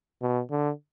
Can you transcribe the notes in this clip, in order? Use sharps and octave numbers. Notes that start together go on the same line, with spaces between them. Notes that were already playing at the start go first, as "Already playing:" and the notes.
B2
D3